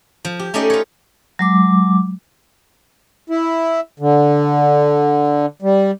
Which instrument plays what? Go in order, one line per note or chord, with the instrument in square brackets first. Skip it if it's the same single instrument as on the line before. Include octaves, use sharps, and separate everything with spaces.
[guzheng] F3
G4
A3 C#4 D#4 G4 D5 D#5
F4 C#5
[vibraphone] F#3 G#3 D6
[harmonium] E4
D3
G3